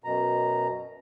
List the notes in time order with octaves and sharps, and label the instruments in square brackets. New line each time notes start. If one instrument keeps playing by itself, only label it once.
[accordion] F#2 B2 A#5